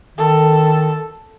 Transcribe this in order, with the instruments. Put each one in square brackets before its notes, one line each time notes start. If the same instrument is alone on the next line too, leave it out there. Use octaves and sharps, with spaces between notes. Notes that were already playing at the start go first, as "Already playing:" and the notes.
[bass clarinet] D#3 [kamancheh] A4